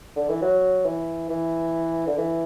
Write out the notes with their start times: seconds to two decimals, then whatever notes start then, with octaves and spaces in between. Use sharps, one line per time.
0.16 D3
0.29 E3
0.42 F#3
0.85 E3
1.30 E3
2.07 D3
2.18 E3